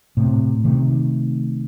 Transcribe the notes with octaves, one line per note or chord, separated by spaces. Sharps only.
A2 C3
C3 D#3 A3